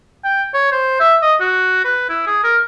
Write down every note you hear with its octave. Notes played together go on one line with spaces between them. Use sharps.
G5
C#5
C5
E5
D#5
F#4
B4
E4
G#4
A#4